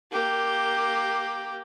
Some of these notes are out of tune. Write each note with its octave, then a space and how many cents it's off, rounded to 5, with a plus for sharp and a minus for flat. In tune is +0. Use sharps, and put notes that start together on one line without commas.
A#3 +0 G4 +0